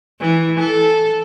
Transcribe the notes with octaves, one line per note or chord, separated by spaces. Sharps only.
E3
A4